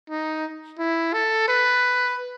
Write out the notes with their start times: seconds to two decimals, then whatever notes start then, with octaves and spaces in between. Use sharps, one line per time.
0.10 D#4
0.78 E4
1.13 A4
1.48 B4